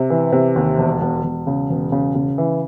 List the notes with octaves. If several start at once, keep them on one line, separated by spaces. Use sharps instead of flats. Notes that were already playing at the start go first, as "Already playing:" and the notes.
Already playing: C3
E3
C3
D#2
E1
E1
E1
C#3
E1
C#3
C#3
E3